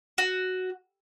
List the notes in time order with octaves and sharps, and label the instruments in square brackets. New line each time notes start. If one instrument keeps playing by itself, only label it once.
[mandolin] F#4